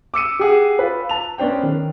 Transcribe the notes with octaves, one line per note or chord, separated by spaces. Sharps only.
D6 E6 C#7 D#7
G4 G#4 F#5
F4 B4
A5 F7
B3 C#4 D4 C5 G5
D#3